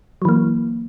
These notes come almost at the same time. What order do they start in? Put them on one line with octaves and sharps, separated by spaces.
F#3 E3 A#3